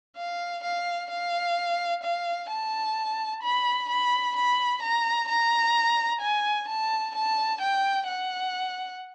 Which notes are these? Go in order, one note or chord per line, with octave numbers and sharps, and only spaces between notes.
F5
F5
F5
F5
A5
B5
B5
B5
A#5
A#5
G#5
A5
A5
G5
F#5